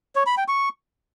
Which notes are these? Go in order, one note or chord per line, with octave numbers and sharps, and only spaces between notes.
C#5
B5
G5
C#6